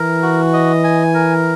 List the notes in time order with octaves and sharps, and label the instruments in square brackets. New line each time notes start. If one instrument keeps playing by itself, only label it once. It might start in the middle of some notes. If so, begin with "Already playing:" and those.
Already playing: [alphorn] E3 [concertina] A#4
[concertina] F#4
D#5
G#5
A#4